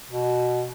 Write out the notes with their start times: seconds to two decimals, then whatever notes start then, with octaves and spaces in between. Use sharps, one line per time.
0.10 B2